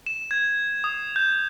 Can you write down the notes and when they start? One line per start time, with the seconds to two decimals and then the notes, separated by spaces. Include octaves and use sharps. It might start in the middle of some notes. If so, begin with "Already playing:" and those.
0.06 E7
0.31 G#6
0.84 D#6
1.16 G6